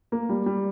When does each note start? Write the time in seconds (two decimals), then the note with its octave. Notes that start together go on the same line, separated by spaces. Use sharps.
0.12 A#3
0.29 G3
0.46 G3